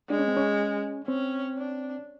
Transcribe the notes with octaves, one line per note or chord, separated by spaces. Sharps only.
G#3 D4
C#4
C4
C#4
C4 C#4
D4